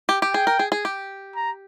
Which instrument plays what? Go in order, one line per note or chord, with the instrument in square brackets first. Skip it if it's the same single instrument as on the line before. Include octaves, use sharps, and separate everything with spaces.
[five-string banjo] G4
G4
[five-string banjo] G#4 [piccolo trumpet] G5
[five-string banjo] A#4
G#4
G#4
G4
[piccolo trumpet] A#5